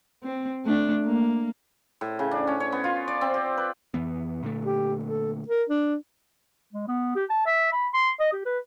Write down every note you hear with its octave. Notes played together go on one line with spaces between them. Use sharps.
C4
A3 D4
A#3
A2
C#3
D4
C#4
C#5
B3
F4
D5
C4
G4
B4
F2 E3 B3
A#2 D3 A3
G4
A4
A#4
D4
G#3
B3
G4
A5
E5
B5
C6
D#5
G4
B4